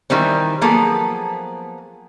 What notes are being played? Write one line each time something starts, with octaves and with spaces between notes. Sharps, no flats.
D#3 E3 G3 C4
F3 F#3 A#3 B3 G#4 A4